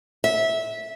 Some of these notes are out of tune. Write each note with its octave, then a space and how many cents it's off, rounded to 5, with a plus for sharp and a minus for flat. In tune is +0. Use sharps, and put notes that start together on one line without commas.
E5 -15